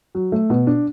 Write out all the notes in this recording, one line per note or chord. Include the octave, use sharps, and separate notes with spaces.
F#3
A3
B2
D4